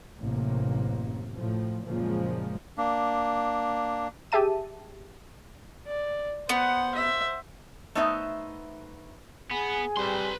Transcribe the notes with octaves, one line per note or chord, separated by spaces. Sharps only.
A1 F#2 C3 A#3
A2 F3
F#2 A#2 C#3 F3 G#3 A#3
A#3 D4
G4 G#4 E5 A5 D#7
D5
B3 C5 F#5
E5
A3 B3 D#4 C5 E5
B3 G#4 G#5
G3 C4 B4 C6